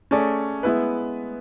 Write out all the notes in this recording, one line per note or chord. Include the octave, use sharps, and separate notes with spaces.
A3 C#4 G#4 D5
G#3 B3 E4 B4